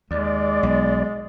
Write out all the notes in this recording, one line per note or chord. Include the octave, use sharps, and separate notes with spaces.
D#2 G#3 D5
B1